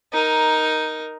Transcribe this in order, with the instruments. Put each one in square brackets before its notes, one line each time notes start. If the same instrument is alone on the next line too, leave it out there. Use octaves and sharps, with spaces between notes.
[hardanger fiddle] D#4 A#4